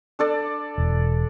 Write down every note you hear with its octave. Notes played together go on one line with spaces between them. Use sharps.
D4 A4 D5
E1